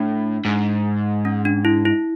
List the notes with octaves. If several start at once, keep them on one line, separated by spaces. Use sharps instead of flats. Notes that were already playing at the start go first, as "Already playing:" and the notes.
Already playing: A2 D4
G#2
C#4
D4
E4
E4